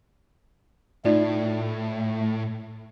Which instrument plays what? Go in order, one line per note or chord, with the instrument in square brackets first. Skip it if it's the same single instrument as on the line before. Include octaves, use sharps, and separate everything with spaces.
[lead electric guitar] A2 [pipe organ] A3 [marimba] D#4 F4 D5